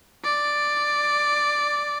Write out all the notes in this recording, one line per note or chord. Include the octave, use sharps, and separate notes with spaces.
D5